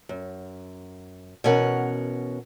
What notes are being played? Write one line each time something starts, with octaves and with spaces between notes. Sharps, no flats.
F#2
B2 E3 C#4 A#4 F#5